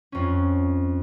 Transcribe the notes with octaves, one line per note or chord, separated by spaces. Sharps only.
F2 C#4